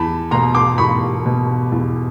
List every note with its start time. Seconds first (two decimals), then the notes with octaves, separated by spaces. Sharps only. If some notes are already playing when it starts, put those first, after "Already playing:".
Already playing: E2 A5 B5
0.31 B2 A#5 C6
0.55 C6 D6
0.78 E2 B5 C#6
1.26 B2
1.72 E2